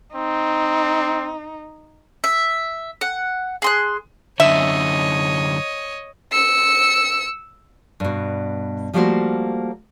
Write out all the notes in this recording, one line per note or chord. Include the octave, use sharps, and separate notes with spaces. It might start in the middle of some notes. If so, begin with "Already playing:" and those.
C4 D#4
E5
F#5
G#4 C6 F#6
F#2 D3 C#5 D#5 E5
E6 C#7
G2 B2
F3 G3 A3 A#3 F#4 C5